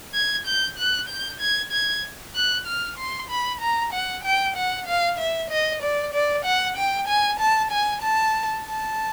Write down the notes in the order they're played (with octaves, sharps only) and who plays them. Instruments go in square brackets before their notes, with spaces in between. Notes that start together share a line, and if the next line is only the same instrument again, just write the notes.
[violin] G#6
G6
F#6
G6
G#6
G#6
F#6
F6
C6
B5
A#5
F#5
G5
F#5
F5
E5
D#5
D5
D5
F#5
G5
G#5
A5
G#5
A5
A5